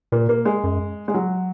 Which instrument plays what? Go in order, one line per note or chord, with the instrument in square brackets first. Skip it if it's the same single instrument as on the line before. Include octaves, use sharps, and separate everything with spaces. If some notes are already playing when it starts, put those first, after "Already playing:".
[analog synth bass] A#2 [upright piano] A#3
[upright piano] A#3
G#3
[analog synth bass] F#2
[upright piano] G#3
F#3